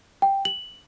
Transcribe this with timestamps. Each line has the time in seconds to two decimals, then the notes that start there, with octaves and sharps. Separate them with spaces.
0.22 G5
0.45 F#7